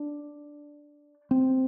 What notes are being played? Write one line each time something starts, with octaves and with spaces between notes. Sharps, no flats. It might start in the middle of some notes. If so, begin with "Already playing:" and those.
Already playing: D4
C4